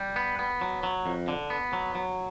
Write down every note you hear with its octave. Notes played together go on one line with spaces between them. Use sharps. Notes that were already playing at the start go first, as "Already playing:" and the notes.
Already playing: G3
B3
B3
F#3
F#3
F2
D3
B3
F#3
F#3